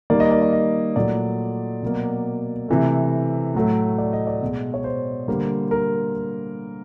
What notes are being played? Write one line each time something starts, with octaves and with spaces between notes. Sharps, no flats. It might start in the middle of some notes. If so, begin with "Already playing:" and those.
D#3 G3 A#3 D5
D#5
D5
D5
D#5
A#2 F#3 A3 D5
B2 F#3 A#3
C3 E3 A3
A2 F#3 A3
D5
D#5
D5
B2 G#3
C#5
C5
D3 G3 A#3
A#4